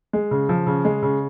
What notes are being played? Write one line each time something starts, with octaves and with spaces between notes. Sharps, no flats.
G#3
C#3
F3
C#3
G#3
C#3